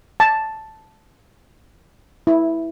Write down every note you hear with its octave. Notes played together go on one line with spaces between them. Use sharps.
A5
E4